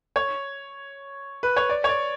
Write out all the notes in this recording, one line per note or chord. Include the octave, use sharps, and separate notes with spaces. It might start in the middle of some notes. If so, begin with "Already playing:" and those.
C#5
B4
C#5
D5
C#5
D5